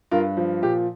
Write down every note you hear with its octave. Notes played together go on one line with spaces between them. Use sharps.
G2 F4 A#4
F3
A#2 G4